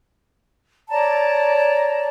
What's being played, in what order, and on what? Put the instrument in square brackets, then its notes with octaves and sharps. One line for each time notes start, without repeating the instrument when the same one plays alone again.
[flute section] C#5 D5 A5 A#5